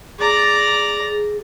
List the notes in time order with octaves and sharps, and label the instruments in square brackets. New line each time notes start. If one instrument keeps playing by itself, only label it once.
[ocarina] G#4 [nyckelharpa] D5 A#5